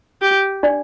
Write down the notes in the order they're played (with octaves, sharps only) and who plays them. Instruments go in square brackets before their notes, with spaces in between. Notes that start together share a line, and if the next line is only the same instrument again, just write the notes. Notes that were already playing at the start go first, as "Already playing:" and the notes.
[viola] G4
[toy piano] D4 D5